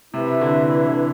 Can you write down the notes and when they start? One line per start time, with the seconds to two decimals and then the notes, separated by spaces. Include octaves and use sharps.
0.14 C3 E4 B4 E5
0.41 D3
0.68 E3
0.86 D3